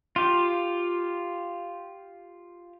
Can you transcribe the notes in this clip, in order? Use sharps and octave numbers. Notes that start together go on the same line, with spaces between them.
F4 G4